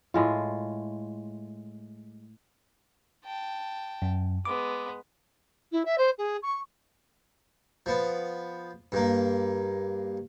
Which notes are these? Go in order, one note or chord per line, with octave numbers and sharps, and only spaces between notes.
A2 G#3 F4
G5 A5
F#2
G#3 B3 D6
E4
E5
C5
G#4
C#6
F3 B3
G2 A#3